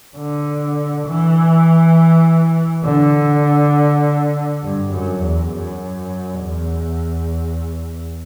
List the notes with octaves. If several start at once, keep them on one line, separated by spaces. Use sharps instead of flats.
D3
E3
D3
G2
F#2
E2
F#2
E2